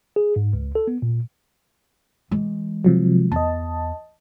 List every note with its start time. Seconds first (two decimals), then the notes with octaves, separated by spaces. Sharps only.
0.16 G#4
0.36 G#2
0.53 C#2
0.75 A4
0.87 B3
1.02 A#2
2.31 E3 G#3
2.84 C3 F3 F#3
3.32 E2 D#5 A5